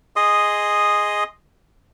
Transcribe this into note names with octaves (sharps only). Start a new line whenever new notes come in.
G#4 D#5 C6 D#6